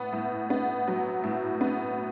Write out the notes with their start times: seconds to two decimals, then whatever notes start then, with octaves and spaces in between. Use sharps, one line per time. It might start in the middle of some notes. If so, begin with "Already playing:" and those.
Already playing: A2 B3
0.13 A2
0.50 B3
0.87 F#3
1.24 A2
1.61 B3